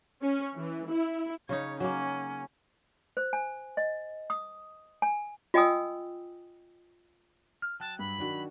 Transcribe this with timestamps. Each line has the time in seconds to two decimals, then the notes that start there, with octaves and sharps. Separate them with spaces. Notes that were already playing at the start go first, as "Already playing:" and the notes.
0.22 C#4
0.56 E3
0.89 E4
1.49 C#3 C#4 D#4 C#5
1.80 F#3 A#3 C#4
3.17 C5
3.33 G#5
3.77 D#5
4.30 D#6
5.02 G#5
5.54 F4 D#5 G5 G#5 D#6 E6
7.62 F6
7.80 F#3 G5 A5 F#6
7.99 G2 B5
8.18 D#3 D4 F#4